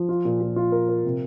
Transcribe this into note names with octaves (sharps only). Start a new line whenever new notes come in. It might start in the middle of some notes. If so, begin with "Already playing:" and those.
Already playing: F3
F4
A#2
A#2
F4
A#4
A#4
C3